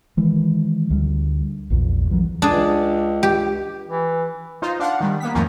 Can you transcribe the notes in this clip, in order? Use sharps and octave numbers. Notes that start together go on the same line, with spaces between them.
D#3 E3 G#3
D2 G3
A#1 E2 A#2
E2 E3 F#3
C#2 D4 G#4
G4
E3
D#4 F4 C5
D4 F5 F#5
D#3 G3
A#3 B3 B6
E2 A2 D#3 F3 A#3 C#4